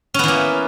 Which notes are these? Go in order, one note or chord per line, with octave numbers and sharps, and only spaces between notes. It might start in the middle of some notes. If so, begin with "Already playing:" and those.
E3 A#3 B3 C#4